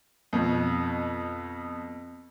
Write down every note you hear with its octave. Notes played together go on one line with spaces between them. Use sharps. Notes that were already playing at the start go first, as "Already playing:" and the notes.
F2 B2